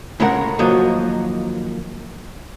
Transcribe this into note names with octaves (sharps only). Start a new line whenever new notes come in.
A2 C#3 G#3 A#4 F5 F#5
D#2 F3 F#3 A#3 D#5 F5